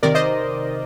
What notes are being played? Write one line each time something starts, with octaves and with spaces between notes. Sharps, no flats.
C3 D#3 A#4 D5
C5 D#5